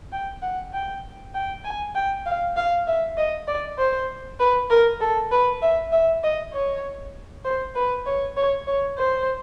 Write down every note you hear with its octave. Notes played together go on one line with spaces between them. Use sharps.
G5
F#5
G5
G5
G#5
G5
F5
F5
E5
D#5
D5
C5
B4
A#4
A4
B4
E5
E5
D#5
C#5
C5
B4
C#5
C#5
C#5
C5